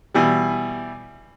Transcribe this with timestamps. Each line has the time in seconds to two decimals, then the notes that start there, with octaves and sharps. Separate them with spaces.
0.15 B2 E3 G3